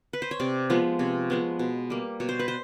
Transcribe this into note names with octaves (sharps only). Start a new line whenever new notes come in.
B4
C5
C#5
C3 D5
F3 G#3 B3
C3 C#5
F3 G#3 B3
B2
G3 A#3
B2 C#5
C5
B4
C5